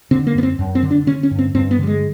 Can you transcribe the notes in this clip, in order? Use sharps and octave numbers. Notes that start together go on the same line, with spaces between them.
D3 C4
A#3
F#2 B3
C4
F#2
C4
D3
D4
D3 C#4
C#4
G2
C4
G2 C4
B3
D3 G3
G#3